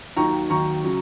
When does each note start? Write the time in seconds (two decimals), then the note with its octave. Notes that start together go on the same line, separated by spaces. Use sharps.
0.17 D#2 D#3 F#3 A#5 C#6
0.50 D#2 D#3 F#3 A#5 C#6
0.84 C#3 F#3